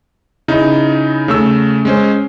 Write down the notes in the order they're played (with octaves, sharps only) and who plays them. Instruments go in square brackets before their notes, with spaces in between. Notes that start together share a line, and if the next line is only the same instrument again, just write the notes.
[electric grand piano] C#3 D#4 E4
C#3 A3 E6
G#3 C#4 C5